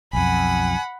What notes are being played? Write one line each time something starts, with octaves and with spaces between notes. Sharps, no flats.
B1 F2 F#5 G#5 B5